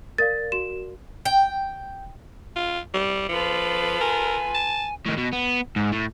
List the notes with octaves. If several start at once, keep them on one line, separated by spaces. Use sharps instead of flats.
A#4 D5 F5 A6
F#4 E7
G5
F4
G3
F3 F4 A4 B4
A#4 G#5
A5
A2 D#3
B2
B3
G#2
A2